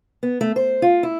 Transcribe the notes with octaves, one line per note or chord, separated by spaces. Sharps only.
B3
A3
C5
F4
E4